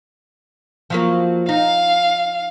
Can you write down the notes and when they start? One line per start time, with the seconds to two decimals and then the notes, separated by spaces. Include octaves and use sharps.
0.90 F3 F#3 A#3
1.49 D#4 F5